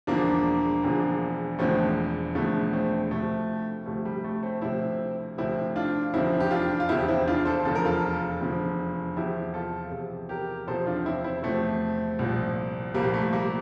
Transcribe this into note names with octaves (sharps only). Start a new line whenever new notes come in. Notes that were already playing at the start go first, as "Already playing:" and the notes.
E1 E2 D3 F3 A#3 D4
E1 E2 D3 F3
E1 E2 D3 F3 A3 C4
E1 E2 D3 F3 A3
A3 C4
D2 C3 F3 A3
D2 C3 F3 A3
G3
A3
A3 C4
D2 C3 F3 C4 E4
D2 C3 F3 C4 E4
D4 F4
F1 E2 D3 F3 C4 E4
G4
D4 F4
F4
F1 E2 D3 F3 E4 G4
C4 E4
D4 F4
A4 C5
F1 E2 D3 F3 A4
A#4
F4 A4
F1 E2 D3 F3
E2 C3 F3 E4 G4
F4 A4
E2 C3 F3
G4 A#4
E2 C3 F3 A4 C5
D4 F4
C4 E4
C4 E4
E2 C3 F3 A3 C4
C2 A#2 F3
C2 A#2 F3 G3 A#3
A3
G3 A#3